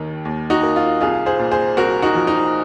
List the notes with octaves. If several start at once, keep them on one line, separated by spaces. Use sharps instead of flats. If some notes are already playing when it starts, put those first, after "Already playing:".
Already playing: D#2 D#3
D#2
D#4 F#4
A#3
F4
C2 F4 G#4
G#4 C5
A#2
G#4 C5
C2 F#4 A#4
D#4 F#4
F3
D#4